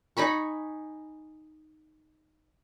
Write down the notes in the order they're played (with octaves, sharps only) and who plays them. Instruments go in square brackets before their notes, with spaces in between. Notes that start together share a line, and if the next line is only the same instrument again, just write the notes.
[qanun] D#4 G#5 B5 C#6